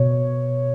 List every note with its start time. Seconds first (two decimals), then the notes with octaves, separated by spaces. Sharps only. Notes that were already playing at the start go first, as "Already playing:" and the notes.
Already playing: B2 C#5